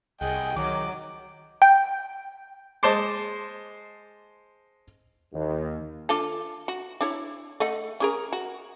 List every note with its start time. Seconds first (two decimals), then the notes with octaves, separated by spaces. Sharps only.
0.21 C2 G#4 D#5 F#5 G5
0.56 D#3 F#3 D#5 D6
1.62 G5
2.83 G#3 C5 A5 C6 D6
5.33 D#2
6.09 D4 F4 A4
6.68 F#4
7.01 D4 E4 C#5
7.60 A3 D#5 F#5
8.00 C#4 G#4 A#4
8.33 F#4